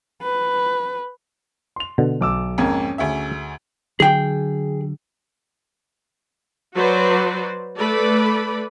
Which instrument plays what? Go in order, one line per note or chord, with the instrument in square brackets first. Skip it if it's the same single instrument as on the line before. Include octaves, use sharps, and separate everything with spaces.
[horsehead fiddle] B4
[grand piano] C6 F7
[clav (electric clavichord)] B2 D3
[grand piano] B1 D6 E6
[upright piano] F2 G#2 A#3 [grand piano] C#4 G#6
[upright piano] D2 G#4 E5
[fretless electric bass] D3 F#3 [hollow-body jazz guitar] G#4 G5
[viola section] F#3 F#4 B4 C5 D5
A3 A4 B4 D5 B5